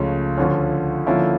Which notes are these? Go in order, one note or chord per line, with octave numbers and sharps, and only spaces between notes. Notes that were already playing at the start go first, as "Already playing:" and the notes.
Already playing: C#2 C#3 F3 A3 C#4
D2 D3 F3 C#4
D3 F3 A#3 C#4 E4